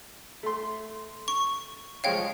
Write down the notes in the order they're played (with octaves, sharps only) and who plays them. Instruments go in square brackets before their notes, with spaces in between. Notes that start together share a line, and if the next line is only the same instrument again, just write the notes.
[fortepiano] A3 C6
[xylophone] C#6
[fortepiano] F3 G#3 C#5 [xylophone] F5 G5